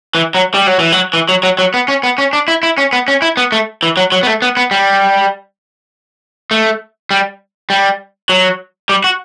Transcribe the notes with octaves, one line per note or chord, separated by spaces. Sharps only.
E3
F#3
G3
F#3
E3
F#3
E3
F#3
F#3
F#3
B3
C#4
B3
C#4
D4
E4
E4
C#4
B3
C#4
E4
B3
A3
E3
F#3
F#3
B3
A3
B3
B3
G3
A3
G3
G3
F#3
G3
F#4